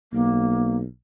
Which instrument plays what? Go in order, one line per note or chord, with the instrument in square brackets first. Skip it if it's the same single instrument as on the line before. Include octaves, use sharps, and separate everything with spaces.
[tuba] B1 [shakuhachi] A#3